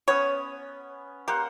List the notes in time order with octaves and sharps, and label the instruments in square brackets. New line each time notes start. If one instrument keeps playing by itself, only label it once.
[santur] B3 C#4 D#6 [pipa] C#5
[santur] A#3 C5 F#5 [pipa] G4